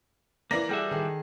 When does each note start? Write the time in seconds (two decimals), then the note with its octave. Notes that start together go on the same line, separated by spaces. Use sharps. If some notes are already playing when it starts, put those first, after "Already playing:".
0.51 E3 A#3 D5 A#6
0.69 G3 F#4 G#4 A4 E5 F#5
0.91 D#3 G#4 A4